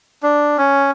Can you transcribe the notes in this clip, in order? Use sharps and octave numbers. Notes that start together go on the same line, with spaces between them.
D4
C#4